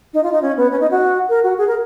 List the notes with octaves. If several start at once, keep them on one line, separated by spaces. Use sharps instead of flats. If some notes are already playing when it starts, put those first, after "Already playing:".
D#4
F4
D#4
C#4
B3
C#4
D#4
F#4
A#4
F#4
G#4
A#4